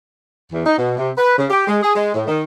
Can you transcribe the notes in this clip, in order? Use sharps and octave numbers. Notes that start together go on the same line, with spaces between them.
E2
D#4
B2
C3
B4
C#3
G4
G#3
G#4
G#3
A2
D#3